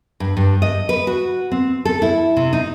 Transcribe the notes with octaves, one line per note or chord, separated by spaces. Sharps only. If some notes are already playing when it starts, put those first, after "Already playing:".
G2
G2
D#5
B4
F#4
C4
A4
E4
C3
D#4